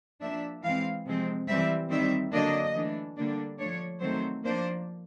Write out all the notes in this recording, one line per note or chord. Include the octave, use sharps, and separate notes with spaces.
F3 A#3 D4 E5
E3 G#3 C4 F5
C3 F3 G#3 C4
E3 G3 C4 E5
D#3 G3 C4 E5
D3 F#3 A#3 D4 D#5
E3 A3 D4
D3 G3 A#3 D4
F3 A3 D4 C#5
D#3 F#3 A3 C4 C5
F3 A#3 D4 C5